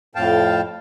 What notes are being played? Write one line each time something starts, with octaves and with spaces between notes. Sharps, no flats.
F2 A2 F5 G5 A5